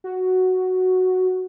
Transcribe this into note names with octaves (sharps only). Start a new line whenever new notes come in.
F#4